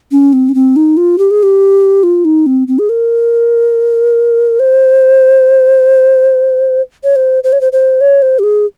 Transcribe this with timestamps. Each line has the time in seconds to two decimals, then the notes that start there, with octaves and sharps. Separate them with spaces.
0.12 C#4
0.33 C4
0.49 C#4
0.55 C4
0.76 D#4
0.97 F4
1.18 G4
1.31 G#4
1.43 G4
2.03 F4
2.25 D#4
2.46 C4
2.68 C4
2.79 G#4
2.89 A#4
4.60 C5
7.04 C#5
7.16 C5
7.44 C5
7.52 C#5
7.61 C5
7.72 C5
8.01 C#5
8.22 C5
8.39 G4
8.43 G#4